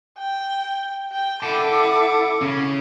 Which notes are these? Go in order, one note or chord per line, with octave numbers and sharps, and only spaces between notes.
G5
G5
E4 A4 F#5 A5 D6
C#3 C#4